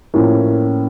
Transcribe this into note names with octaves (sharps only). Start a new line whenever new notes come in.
A2 F3 A#3 C#4